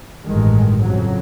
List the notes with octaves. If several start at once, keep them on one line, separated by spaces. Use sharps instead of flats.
A1 G2 D#3 G#3
F2 C#3 F#3